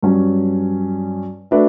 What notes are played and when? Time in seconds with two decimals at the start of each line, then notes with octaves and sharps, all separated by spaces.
0.03 G2 F#3 C#4
1.51 A3 D4 F#4 B4 E5